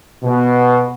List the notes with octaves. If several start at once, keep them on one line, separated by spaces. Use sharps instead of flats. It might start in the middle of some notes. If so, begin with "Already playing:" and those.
B2